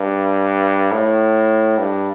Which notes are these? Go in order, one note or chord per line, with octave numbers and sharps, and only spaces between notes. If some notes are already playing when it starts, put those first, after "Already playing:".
Already playing: G2
A2
G2